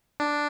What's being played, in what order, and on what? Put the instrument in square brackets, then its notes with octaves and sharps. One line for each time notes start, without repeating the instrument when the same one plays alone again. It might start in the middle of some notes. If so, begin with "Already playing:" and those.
[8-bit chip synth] D4